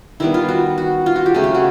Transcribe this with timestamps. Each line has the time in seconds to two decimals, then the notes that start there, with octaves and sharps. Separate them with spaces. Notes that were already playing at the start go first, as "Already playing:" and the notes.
0.20 D#3 G3 B3 E4
0.34 F4
0.48 F#4
0.78 F#4
1.06 F4
1.16 F#4
1.26 G4
1.34 C#3 F#3 A3 G#4
1.44 G4
1.54 F#4